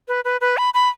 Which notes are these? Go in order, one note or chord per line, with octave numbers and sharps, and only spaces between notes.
B4
B4
B4
B5
B5